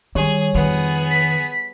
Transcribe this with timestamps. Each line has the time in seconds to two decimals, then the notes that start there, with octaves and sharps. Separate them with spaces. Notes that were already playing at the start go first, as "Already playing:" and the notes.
0.15 D#3 G3 G#4 C#5
0.55 F2 D#3 B3 G#4
1.11 B6